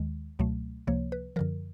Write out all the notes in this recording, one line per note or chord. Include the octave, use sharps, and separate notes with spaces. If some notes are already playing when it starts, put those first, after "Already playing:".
Already playing: D#2 D#3 G#3
C#2 B2 F#3 A3
C#2 C3 F3 A#3 C#5
B4
F#2 D3 F3 A#4